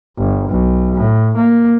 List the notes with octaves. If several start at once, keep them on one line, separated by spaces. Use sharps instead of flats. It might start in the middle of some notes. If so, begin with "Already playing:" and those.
G1
B1
A2
A#3